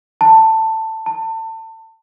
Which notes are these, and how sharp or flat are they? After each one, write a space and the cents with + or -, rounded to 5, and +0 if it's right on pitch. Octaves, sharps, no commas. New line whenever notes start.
A5 +15
A5 +30